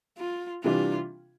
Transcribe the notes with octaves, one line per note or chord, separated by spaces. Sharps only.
F4
C3 E3 G3 D4 F4